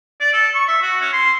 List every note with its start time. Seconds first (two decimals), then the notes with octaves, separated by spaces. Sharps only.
0.20 D5
0.33 A4
0.54 C#6
0.68 E5
0.82 F#4
1.01 C#4
1.13 C6